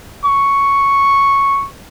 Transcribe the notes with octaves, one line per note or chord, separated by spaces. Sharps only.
C#6